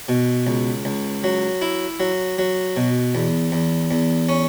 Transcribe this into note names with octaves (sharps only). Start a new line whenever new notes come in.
B2
C#2
C#2
F#3
E4
F#3
F#3
B2
E2
E2
E2
C#4